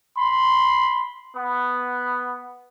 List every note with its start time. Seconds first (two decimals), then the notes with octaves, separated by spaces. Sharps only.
0.16 B5 C6
1.35 B3